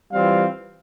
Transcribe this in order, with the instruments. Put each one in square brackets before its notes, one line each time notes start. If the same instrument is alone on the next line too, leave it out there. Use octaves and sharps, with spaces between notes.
[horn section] E3 G3 C4 F4 [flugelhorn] F5